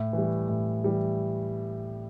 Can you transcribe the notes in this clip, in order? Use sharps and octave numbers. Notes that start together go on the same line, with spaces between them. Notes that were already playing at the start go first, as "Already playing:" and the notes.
Already playing: A2
E3 G3
A2
E3 G3